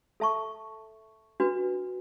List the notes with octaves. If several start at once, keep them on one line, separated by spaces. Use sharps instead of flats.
A4 E5 A5 C#6
D4 F#4 B4